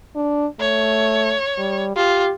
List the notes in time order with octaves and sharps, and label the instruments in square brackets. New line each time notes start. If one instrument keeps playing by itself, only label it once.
[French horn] D4
[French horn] A3 [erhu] C#5
[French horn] G3
[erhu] F4 [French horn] G4